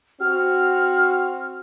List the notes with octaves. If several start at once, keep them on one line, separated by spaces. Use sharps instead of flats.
C4 F#4 F6